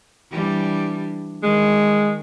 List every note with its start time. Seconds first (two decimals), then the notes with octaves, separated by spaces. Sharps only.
0.30 E3 G3 D4
1.43 D#3 G#3